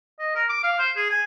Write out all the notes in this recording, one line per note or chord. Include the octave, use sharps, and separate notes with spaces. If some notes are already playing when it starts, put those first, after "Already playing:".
D#5
A#4
D6
F5
C5
G#4
G#5